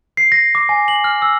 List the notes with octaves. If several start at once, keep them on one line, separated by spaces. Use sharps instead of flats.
C7
A#6
D6
G#5
F#7
F6
E6